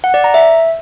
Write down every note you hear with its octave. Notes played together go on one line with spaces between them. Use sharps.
F#5
D5
A#5
E5